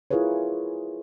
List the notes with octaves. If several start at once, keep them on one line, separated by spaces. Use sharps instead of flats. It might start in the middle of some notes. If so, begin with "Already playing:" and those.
E4 F4 G#4 A#4 B4 C#5